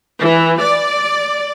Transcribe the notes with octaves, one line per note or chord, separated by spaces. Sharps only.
E3
D5